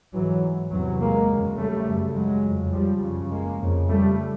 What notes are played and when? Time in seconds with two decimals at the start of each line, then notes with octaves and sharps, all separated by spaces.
0.14 G#2 E3 F#3
0.71 E2 C3 E3 F#3
1.00 G#3 A#3
1.29 F#2 C#3
1.58 G3 A3
1.86 F#2 C#3
2.16 F#3 G#3
2.44 F2 C#3
2.73 F3 G3
3.02 F#2 C#3
3.30 G#3 A#3
3.60 F2 C#3
3.88 G3 A3